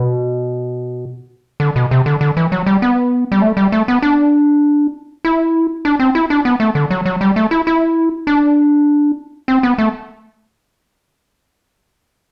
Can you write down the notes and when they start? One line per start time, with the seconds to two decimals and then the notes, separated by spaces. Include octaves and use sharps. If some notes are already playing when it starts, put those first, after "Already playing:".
Already playing: B2
1.60 D3
1.76 B2
1.91 C3
2.06 D3
2.21 D3
2.37 E3
2.52 F#3
2.66 G3
2.82 B3
3.32 G3
3.42 A3
3.57 G3
3.72 A3
3.88 B3
4.02 D4
5.25 E4
5.85 D4
5.99 C4
6.15 E4
6.30 D4
6.45 B3
6.60 A3
6.75 D3
6.90 F#3
7.06 F#3
7.21 G3
7.36 A3
7.51 E4
7.67 E4
8.27 D4
9.48 C4
9.63 B3
9.78 A3